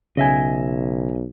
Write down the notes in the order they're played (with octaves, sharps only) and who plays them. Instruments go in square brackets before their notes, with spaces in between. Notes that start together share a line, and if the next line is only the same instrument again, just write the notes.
[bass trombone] B1 [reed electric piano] C#3 [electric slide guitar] D#5 E5 G#5